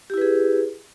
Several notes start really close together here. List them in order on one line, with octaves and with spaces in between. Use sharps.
G4 E4 B4 G#4